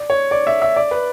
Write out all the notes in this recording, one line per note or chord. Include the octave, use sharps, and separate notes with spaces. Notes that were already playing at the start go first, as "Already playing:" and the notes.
Already playing: D5
C#5
D5
E5
E5
D5
B4